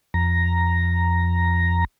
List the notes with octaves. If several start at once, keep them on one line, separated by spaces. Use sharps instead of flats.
F2 A#5